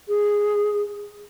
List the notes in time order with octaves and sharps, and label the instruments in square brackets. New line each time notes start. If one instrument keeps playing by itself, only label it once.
[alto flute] G#4